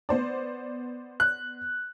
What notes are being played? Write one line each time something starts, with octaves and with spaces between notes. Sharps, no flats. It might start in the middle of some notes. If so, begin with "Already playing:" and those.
B3 C5 D5
F#6